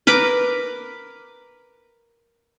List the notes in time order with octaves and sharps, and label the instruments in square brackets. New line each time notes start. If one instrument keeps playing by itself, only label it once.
[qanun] A#4 B4 B5 D6